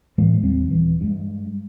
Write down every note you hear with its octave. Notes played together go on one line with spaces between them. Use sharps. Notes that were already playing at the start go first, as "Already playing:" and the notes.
A2 E3 G#3 A#3
D#2 G3 C4
D#1 E3
G2 G#3